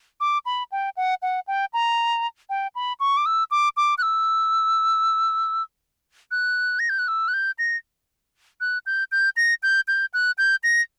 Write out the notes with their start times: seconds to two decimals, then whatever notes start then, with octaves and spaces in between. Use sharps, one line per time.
0.20 D6
0.46 B5
0.72 G5
0.97 F#5
1.22 F#5
1.47 G5
1.73 A#5
2.50 G5
2.75 B5
3.00 C#6
3.17 D6
3.26 E6
3.51 D6
3.77 D6
3.98 F#6
4.02 E6
6.31 F#6
6.79 A#6
6.89 G6
6.99 F#6
7.08 E6
7.28 F#6
7.34 G6
7.59 A#6
8.61 F#6
8.86 G6
9.12 G6
9.36 A#6
9.63 G6
9.88 G6
10.14 F#6
10.38 G6
10.63 A#6